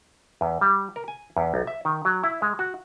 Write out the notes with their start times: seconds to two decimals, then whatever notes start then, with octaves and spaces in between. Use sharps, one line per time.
0.41 E2
0.61 G3
0.96 A#4
1.08 G#5
1.37 E2
1.54 B1
1.67 E5
1.85 D#3
2.05 F#3
2.24 E4
2.42 G#3
2.59 F#4